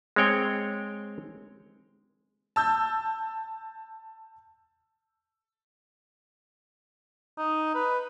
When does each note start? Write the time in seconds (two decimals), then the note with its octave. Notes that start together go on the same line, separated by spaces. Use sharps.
0.16 G#3 C4 C#5 G5
2.56 A5 E6 G6
7.38 D#4
7.75 B4